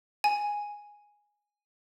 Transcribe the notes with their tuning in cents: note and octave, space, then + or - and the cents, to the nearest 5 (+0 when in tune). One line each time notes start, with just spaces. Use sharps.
G#5 -5